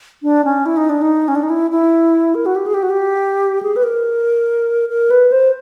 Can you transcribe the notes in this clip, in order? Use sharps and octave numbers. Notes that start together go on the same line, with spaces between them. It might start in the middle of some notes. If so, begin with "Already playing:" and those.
D4
C#4
E4
D#4
D4
D#4
C#4
D4
D#4
E4
E4
A#4
F#4
G4
G#4
G4
F#4
G4
G#4
B4
A#4
A#4
B4
C5